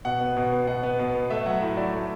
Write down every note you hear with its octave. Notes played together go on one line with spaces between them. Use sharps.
B2 F#5
B3
B2
B3
B2 F#5
B3
B2
B3
A3 E5
F#3 F#5
A2 F#5
A2 D5
A3